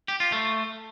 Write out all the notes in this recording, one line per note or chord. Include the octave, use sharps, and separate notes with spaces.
G4
F4
A3